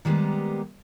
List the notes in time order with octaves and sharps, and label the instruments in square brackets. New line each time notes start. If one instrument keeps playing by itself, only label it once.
[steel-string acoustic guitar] D#3 G3 G#3 A#3 B3 G4